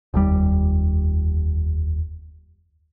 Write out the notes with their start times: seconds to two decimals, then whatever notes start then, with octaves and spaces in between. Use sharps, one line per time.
0.14 F1 D#2 G3